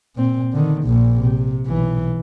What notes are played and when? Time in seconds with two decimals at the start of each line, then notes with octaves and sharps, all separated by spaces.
0.16 A#2 C4
0.53 D3 D#3
0.84 A#1 A#2
1.20 C3
1.66 B1 E3